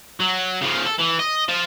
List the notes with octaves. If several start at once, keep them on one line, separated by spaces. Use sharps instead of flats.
F#3
C#3 F3
A4
E3
D#5
F4 C5